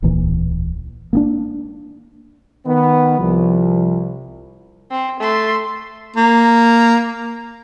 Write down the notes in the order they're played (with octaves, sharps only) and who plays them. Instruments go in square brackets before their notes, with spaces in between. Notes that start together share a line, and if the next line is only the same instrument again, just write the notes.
[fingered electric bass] D1 B1 A#2 E3
A#3 B3 D4
[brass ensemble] D#3 B3
[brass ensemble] C2 [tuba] F3
[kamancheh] C4
A3 C6
[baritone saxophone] A#3